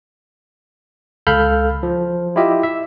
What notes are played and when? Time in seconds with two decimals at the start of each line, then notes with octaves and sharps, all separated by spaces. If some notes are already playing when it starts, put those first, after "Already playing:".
1.27 C#2 A4 F5 B5 F6 G6
1.83 F3
2.36 E4 F4 G4 D#5 E5
2.63 E5